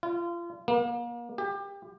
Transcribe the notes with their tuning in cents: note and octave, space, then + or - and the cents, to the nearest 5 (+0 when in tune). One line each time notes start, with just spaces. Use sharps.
F4 -30
A#3 +35
G4 +25